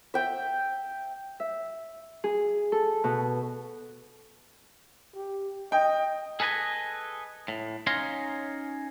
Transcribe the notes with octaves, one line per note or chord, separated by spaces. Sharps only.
E5 G5
E5
G#4
A4
B2
G4
D#5 G5
G#4 A4 B4 D#5 G#5
A2
C#4 D#4 C#5 F5 A#5 C6